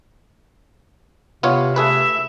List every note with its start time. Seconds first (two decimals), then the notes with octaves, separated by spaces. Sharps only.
1.43 C3 B3 F4 C#5
1.76 A3 G#4 B4 E5